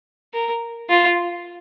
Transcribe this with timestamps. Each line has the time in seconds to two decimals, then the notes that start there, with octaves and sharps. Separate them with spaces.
0.34 A#4
0.90 F4